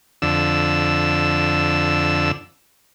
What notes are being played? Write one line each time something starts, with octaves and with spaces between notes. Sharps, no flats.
F2 D3 E6